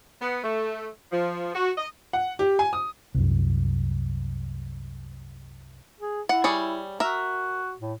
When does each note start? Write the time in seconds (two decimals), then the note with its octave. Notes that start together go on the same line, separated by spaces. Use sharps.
0.20 B3
0.43 A3
1.12 F3
1.55 F#4
1.78 D#5
2.13 F#5
2.39 G4
2.59 G#5
2.73 D#6
3.15 C2 F#2
6.00 G#4
6.29 E4 F#5
6.44 G3 G#4 C#5
7.00 F#4 A#4 E5
7.80 A2